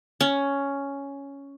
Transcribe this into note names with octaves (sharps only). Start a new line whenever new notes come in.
C#4